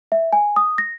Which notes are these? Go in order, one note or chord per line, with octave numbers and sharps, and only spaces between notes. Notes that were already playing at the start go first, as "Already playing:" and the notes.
E5
G#5
D#6
A#6